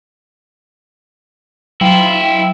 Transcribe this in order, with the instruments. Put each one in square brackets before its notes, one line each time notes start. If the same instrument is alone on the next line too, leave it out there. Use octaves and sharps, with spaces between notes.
[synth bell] F#3 G5 [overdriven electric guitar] E4 F4